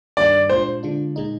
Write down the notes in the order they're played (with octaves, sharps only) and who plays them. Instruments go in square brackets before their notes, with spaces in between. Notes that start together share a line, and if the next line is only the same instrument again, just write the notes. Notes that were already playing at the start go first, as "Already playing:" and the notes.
[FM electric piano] G2 D#3 G3 A#3 D4 [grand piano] D5
[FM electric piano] A#2 G#3 D4 F4 [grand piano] C5
[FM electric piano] D3 G#3 D4 F4
A#2 G#3 D#4